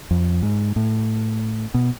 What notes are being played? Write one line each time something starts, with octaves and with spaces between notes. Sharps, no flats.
F2
G#2
A2
B2